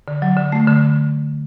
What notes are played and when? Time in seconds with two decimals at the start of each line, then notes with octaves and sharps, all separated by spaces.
0.08 D3
0.22 F#3
0.36 D3
0.52 A3
0.67 D3